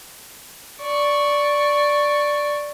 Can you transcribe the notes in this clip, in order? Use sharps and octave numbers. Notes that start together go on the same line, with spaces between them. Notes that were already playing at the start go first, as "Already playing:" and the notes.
D5 C#6